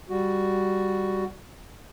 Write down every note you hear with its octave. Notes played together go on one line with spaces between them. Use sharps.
G3 F#4